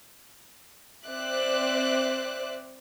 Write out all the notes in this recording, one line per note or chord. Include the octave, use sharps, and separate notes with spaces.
C4 C5 D5 E5 D6 F#6